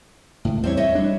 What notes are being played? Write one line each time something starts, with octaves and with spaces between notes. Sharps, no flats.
C#2 A2
E2 G3 C4 E4 C#5
C#5 D#5 E5
G3 D4